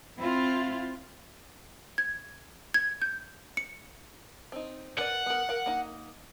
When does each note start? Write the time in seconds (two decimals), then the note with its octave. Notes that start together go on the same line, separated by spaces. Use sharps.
0.18 C4 E4 F4
1.98 G#6
2.74 G#6
3.02 G6
3.57 C#7
4.52 C4 D#4
4.98 A#4 B4 D5 F#5
5.26 B3 A#4
5.49 A#4 F5
5.66 A#3 D#4